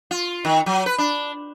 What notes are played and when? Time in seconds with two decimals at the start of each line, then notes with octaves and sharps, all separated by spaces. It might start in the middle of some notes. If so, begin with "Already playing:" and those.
0.11 F4
0.45 D#3
0.66 F#3
0.86 B4
0.98 D4